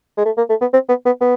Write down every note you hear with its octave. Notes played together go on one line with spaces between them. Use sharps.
G#3
A3
A#3
A3
B3
C4
B3
B3
B3